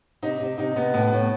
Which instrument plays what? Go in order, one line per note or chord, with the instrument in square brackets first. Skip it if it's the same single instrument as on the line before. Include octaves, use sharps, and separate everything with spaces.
[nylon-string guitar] C3 [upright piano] D#4
[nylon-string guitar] C3
[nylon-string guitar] C3 [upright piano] D#4
[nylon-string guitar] C3 [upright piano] B3
[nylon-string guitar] A2 [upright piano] B3
[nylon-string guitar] A2